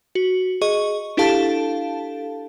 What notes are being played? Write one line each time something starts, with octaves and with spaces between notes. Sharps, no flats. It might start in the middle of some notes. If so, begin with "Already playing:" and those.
F#4
G#4 D#5 C#6
D4 E4 G4 A4 F5 A5